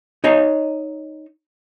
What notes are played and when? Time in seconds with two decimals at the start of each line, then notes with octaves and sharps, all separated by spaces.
0.24 D#4 C#5 D#5 A#5